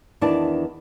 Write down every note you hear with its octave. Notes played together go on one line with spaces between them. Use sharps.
E2 D#3 E3 D4 D5 A5